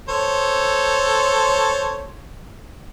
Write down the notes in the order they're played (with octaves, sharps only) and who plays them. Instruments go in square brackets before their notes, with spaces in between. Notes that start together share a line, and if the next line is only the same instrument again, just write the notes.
[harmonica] A4 C5 C#5